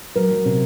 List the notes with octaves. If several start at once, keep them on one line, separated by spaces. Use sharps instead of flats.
F#3 A#4
F#3
C3